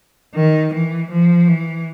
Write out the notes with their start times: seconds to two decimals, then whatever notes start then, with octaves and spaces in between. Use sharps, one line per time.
0.34 D#3
0.73 E3
1.11 F3
1.48 E3